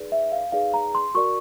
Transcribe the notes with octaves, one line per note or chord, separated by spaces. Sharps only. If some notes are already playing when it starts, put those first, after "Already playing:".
Already playing: D#4 G#4 B4 D5
E5
F5
D#4 G#4 B4 D5 F5
A#5
C6
F#4 A#4 D5 C#6